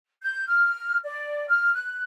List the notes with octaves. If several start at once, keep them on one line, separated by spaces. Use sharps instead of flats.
G6
F6
D5
F6
F#6